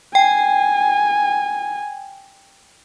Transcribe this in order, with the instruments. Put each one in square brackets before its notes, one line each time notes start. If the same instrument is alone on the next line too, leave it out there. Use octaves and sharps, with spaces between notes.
[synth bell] G5 [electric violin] G#5